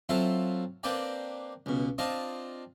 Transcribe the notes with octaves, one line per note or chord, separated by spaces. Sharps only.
F#3 C4 E4 F4 A4 E5
A#3 C4 D4 B4 D5 G5
C#2 B2
C4 D4 F4 D#5 A5